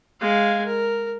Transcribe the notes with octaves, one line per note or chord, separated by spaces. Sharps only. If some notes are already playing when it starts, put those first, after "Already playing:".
G#3 F5
A#4